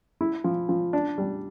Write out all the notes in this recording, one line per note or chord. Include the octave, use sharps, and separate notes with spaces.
E4
F3
F3
D4
G3